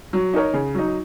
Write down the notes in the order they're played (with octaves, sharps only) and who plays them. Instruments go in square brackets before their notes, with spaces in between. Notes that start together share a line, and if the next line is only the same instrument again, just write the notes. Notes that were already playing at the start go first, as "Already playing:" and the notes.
[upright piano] F#3
D#4 A#4 C#5
C#3
F#3 D#4